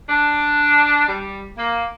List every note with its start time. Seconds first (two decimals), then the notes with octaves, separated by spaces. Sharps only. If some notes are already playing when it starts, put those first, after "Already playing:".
0.09 D4
1.07 G3
1.57 A#3